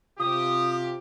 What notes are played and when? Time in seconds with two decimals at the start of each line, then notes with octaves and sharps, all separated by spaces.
0.19 C3 F4 G4 D#6